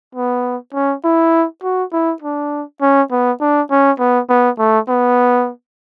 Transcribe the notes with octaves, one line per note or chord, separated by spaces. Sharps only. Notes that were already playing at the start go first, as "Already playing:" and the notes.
B3
C#4
E4
F#4
E4
D4
C#4
B3
D4
C#4
B3
B3
A3
B3